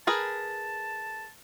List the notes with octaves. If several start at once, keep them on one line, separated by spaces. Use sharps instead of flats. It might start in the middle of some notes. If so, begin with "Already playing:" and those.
G#4 A#4 B4 A5